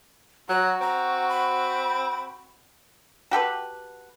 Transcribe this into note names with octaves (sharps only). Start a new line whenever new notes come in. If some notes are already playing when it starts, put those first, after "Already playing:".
F#3 F#4 A#5
C4 A#5
B5
F#4 G4 A4 B4